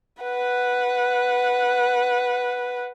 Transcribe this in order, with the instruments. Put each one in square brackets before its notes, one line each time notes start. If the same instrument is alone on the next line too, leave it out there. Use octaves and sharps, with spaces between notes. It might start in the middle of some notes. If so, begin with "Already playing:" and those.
[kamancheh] B4 F#5